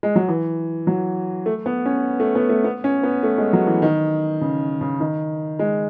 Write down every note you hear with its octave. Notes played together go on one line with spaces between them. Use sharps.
G#3
F#3
E3
F#3
A3
B3
C#4
A3
B3
A3
B3
C#4
B3
A3
G#3
F#3
E3
D#3
C#3
C#3
D#3
G#3